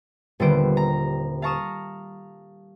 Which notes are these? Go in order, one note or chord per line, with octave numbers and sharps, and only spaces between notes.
D#1 D3 G3 B3 C5 D7
A#5
F5 A5 A#5 C#6 D#6 E7